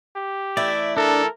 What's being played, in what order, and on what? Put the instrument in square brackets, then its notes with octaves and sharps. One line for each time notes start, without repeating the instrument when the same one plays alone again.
[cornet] G4
[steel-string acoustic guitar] E3 A3 E4 [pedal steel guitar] D5
[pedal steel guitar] D4 [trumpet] A4 [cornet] A#4